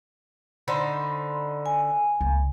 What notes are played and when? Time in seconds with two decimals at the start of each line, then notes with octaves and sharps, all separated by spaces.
0.68 D3 D#4 C5 B5 C6
1.66 G#5
2.21 C#2